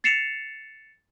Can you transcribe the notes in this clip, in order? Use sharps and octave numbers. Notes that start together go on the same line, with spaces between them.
A6 C7 C#7 E7 F7